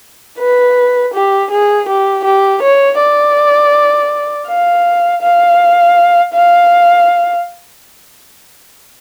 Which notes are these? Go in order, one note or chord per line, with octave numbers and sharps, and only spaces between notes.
B4
G4
G#4
G4
G4
C#5
D5
F5
F5
F5